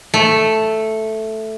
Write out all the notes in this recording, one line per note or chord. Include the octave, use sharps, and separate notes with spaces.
A3